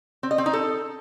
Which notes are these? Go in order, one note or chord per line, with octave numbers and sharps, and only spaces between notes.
C4
D#5
C4
D#4
A4